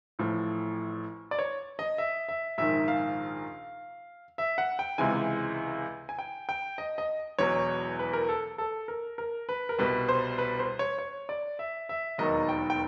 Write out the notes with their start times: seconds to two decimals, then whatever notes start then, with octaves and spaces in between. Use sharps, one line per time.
0.19 A1 A2 F3
1.31 D5
1.39 C#5
1.79 D#5
1.98 E5
2.29 E5
2.58 A#1 G#2 D#3 E5
2.88 F5
4.38 E5
4.58 F#5
4.79 G5
4.98 C#2 C3 E3 G#3 G#5
6.09 G#5
6.19 G5
6.49 G5
6.78 D#5
6.98 D#5
7.39 E1 E2 B2 F#3 C#5
7.99 B4
8.13 A#4
8.29 A4
8.58 A4
8.88 A#4
9.18 A#4
9.49 B4
9.69 A#4
9.79 C2 B2 G3 B4
10.09 C5
10.38 B4
10.59 C5
10.79 C#5
10.99 C#5
11.29 D5
11.59 E5
11.89 E5
12.18 E1 D#2 D#3 F#3 D#5
12.49 G5
12.70 G5